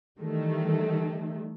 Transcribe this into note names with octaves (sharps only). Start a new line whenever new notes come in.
D#3 E3 G3 A3